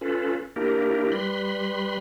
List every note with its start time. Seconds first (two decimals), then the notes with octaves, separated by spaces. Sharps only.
0.01 C#4 F4 A4 B4
0.56 A#3 D4 E4 G4 A#4
1.12 G3 B4 B5 C6